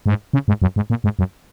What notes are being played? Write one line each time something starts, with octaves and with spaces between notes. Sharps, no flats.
G#2
C#3
G#2
F#2
G#2
A#2
G#2
F#2